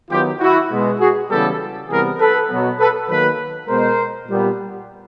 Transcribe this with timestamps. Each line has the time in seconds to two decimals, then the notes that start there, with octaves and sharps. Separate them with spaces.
0.10 D#3 F#3 B3 F4 G4
0.40 E4 F#4
0.70 B2 G#3 B3
0.99 F#4 G#4
1.30 C#3 E3 G3 B3 G4 A4
1.89 C3 E3 G3 B3 G#4 A#4
2.19 A4 B4
2.50 B2 F#3 B3
2.79 A4 B4
3.08 D#3 F#3 A#3 A4 B4
3.68 B2 G#3 B3 A#4 C5
4.28 A#2 G3 B3